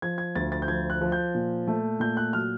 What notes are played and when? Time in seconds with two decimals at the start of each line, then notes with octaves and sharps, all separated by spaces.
0.02 F3 G#6
0.18 G#6
0.36 D2 A6
0.52 A6
0.62 G6
0.68 F3 G#6
0.90 F#6
1.01 F3
1.12 G6
1.35 A#2
1.68 A3
2.00 A#2 G6
2.17 F#6
2.33 F#3 F6